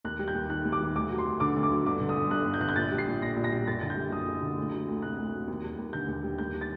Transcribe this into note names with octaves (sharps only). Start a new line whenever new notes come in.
D#2 F#6
G3
G6
D#2
D#3 F#6
D#2
D6
G3
D2 D6
F#3
C6
D2
D3 D6
D2
D6
F#3
G1 D6
D3
D#6
G1
G2 F#6
G1
G6
D3 F#6
G6
A#1 A6
G3
C7
A#1
A#2 A#6
A#1
A#6
G3
F#1 A6
D3 A6
G6
G3
F#2 D#6
F#1
D3
D2
F#3
D2
C3 F#6
D2
F#3
D#2
G3
D#2
D3 G6
D#2
G3
D#2 G6
G3
A6